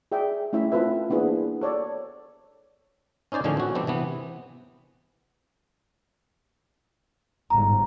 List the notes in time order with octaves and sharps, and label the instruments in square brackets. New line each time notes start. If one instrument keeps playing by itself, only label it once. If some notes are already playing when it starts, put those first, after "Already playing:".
[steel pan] G#4 D5 E5 G5
A3 C#4 E4 E5
C4 F4 A4 B4 E5
A#3 B3 D4 E4 G#4
A4 C#5 D5
[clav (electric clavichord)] C#4 D#4 C5 D5 G#5
A2 D3 D#3 F3 C#4 G#4
C4 F#4
E3 G3 B3 C4 D4
C3 E3 B3
[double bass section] G1 G#2 [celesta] A#5